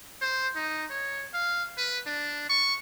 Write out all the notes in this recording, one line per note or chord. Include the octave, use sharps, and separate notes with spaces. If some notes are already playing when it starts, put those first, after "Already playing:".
C5
D#4
C#5
F5
B4
D4
C#6